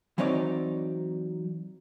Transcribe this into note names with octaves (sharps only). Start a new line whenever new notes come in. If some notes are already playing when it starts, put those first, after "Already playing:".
E3 F#3 C4 D#4 C#5 D5